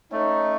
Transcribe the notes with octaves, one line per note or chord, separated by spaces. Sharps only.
A3 C#4 D#4